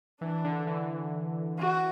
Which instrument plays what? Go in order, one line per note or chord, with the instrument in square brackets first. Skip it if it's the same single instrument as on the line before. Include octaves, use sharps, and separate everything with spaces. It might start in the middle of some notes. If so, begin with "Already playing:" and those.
[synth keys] E3 [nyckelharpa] D4
[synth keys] D3
E3
[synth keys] E3 [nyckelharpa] F#4